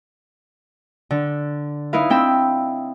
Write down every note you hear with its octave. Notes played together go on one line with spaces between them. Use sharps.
D3
D#4 E4 B4 F5
C4 G5 B5 E6